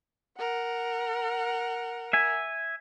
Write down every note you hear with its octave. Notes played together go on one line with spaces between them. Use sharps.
A#4 F#5
E5 G#5